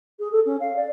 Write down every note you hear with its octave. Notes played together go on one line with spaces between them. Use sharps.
G#4
A4
C#4
F5
D5